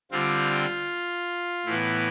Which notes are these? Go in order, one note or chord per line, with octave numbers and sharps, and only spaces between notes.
D3 G3 C4 F4
A2 E3 B3 E4